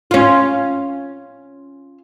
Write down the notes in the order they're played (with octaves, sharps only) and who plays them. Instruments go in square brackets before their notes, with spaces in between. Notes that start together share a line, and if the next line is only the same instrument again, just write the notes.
[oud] C#4 F4